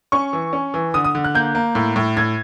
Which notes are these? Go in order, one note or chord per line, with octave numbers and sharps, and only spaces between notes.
C#4 C#6
E3
C#4
E3
D3 D#6
D#6
D3
F#6
A#3 G6
A#3
A2
A2
A2 G#6